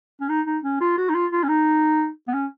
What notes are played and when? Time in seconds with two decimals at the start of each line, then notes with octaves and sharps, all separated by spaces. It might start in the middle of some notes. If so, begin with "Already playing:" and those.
0.21 C#4
0.29 D#4
0.47 D#4
0.64 C#4
0.80 F4
0.98 F#4
1.09 D#4
1.14 F4
1.32 F4
1.43 C#4
1.49 D#4
2.28 B3
2.34 C#4